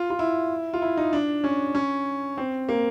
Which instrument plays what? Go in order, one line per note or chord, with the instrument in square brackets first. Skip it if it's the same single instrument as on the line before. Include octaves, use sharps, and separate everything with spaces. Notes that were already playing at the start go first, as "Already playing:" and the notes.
Already playing: [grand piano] F4
F4
E4
F4
E4
D#4
D4
C#4
C#4
C4
A#3